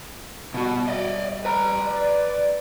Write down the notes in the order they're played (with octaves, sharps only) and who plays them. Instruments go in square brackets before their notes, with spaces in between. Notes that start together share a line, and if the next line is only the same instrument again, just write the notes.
[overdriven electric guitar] B2 F#4 [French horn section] G3
[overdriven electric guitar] D5 D#5
B4 A#5
[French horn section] D5